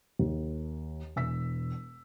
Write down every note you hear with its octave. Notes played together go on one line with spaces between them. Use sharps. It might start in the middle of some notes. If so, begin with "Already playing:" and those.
D#2
E1 E6 B6